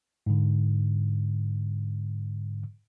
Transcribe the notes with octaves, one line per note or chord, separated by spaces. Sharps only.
G#2 D3